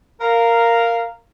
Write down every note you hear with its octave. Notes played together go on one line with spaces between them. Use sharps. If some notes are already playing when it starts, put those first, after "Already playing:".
A#4 F5